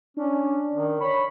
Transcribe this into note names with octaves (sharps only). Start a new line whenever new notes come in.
C#4 D4
D#3
C#5 B5